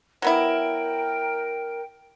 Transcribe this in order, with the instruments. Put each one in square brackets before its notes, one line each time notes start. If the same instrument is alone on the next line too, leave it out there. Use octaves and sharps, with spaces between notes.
[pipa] F#3 B3 E4 [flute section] A#4 G5